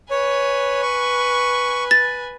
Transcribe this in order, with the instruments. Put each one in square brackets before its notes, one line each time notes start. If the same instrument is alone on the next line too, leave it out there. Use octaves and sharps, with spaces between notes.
[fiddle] B4 G#5 [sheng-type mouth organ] C#5
[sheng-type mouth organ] C#6
[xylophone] A6